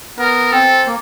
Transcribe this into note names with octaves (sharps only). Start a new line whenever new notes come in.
B3 A#4
C4 A4
A#3